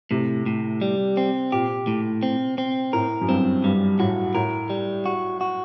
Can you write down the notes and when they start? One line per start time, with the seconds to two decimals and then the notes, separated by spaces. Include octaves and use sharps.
0.11 A2 C3
0.46 A2
0.81 G3
1.17 C4
1.52 A#2 G4
1.87 A2
2.23 C4
2.58 C4
2.93 A2 A#4
3.21 F#2
3.29 G2 C4
3.64 G2 G3
3.99 A2 F#4
4.35 A2 A#4
4.70 G3
5.06 F#4
5.41 F#4